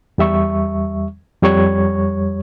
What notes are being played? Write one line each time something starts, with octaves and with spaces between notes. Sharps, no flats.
E2 G3 E5 C#6
F2 G3 C#5 C#6 G#6